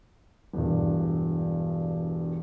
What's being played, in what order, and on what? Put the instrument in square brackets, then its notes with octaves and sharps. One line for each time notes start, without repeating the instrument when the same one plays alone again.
[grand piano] E1 G2